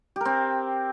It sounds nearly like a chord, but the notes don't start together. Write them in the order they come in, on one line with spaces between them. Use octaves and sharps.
G4 A#4 C4